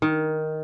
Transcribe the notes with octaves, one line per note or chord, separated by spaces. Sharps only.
D#3